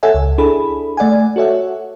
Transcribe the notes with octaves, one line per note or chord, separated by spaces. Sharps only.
A4 C#5 E5 F#5 G#5
C#2
D4 E4 G#4 A4 B5
A3 D5 F#5 G#5
F#4 A4 C#5 E5 F#5